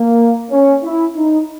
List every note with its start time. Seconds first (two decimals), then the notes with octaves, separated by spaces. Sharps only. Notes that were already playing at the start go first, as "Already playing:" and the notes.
Already playing: A#3
0.50 C#4
0.84 E4
1.16 D#4